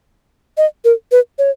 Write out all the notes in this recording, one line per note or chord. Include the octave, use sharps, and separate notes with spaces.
D#5
A#4
B4
C#5